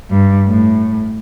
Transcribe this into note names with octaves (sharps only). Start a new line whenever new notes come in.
G2
A2